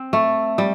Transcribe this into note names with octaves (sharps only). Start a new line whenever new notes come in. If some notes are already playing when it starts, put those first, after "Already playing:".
Already playing: C4
A3
G3